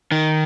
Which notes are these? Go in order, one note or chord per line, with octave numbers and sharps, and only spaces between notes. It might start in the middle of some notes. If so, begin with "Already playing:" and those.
D#3